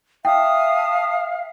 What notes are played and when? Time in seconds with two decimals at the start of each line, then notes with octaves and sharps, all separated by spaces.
0.25 E5 F5 G5 A5 D#6